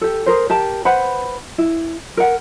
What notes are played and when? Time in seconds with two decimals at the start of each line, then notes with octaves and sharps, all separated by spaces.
0.01 G4 A4
0.26 G#4 A#4 C5
0.50 G4 A#4 A5
0.85 B4 C5 F#5 B5
1.58 E4
2.17 A#4 F#5